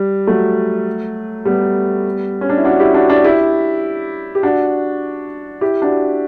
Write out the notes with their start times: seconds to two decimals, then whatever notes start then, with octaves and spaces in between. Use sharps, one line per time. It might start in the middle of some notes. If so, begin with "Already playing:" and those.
Already playing: G3
0.27 F#3 A3
1.45 G3 B3
2.41 C#4
2.49 D4
2.58 E4
2.64 D4 F#4
2.79 E4 G4
2.94 D4 F#4
3.09 D4 F#4
3.24 E4 G4
4.35 G4
4.43 D4 F#4
5.61 E4 G4
5.82 D4 F#4